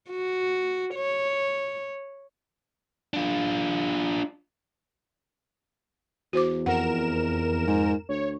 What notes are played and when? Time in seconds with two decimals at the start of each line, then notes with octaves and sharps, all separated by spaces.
0.10 F#4
0.95 C#5
3.14 D4 F4
6.33 E2 F#4 C5 D6
6.66 F2 A#4 F#5 E7
7.67 G#2
8.09 D2 C#5